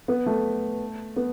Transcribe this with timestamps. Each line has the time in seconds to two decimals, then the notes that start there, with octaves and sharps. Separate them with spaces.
0.08 B3
0.26 A3
1.16 B3